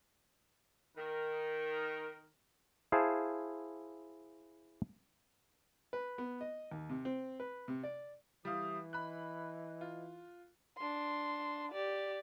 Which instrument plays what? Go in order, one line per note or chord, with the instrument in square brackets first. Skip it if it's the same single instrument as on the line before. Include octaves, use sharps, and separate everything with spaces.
[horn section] D#3 A#4
[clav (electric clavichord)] E4 G#4 C5 F5 A5
[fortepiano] B4
B3
D#5
D#2
C3
C4
B4
C3
D5
[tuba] E3 [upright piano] G3 E4 F5 [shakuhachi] D#6
[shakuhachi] D#5 [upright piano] B5 F#6
[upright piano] F4
[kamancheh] D4 C6
G4 D5